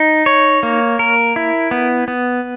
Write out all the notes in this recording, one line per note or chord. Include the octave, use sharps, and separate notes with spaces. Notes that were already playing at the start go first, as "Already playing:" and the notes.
Already playing: D#4
C#5
A#3
A#4
E4
B3
B3